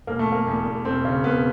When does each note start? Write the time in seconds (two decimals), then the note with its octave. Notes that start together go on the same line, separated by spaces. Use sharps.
0.07 E1 A#3
0.19 A3
0.27 E2
0.32 A#3
0.47 E2
0.66 E2
0.85 E1 C4
1.05 C#3
1.24 E1 B3